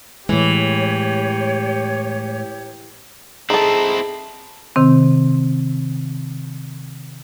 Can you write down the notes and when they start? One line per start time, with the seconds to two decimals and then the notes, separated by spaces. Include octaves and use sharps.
0.29 A2 E3 G#3 G4 C#5
3.50 C4 D#4 E4 G#4 A4
4.76 C3 D#3 C4